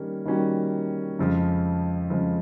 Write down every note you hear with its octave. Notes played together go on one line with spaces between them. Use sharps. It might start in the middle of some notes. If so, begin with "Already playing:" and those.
Already playing: D#3 G3 A#3 C#4
D#3 G3 A#3 C#4 F#4
F2 C#3 F3 G#3
F2 C#3 F3 G#3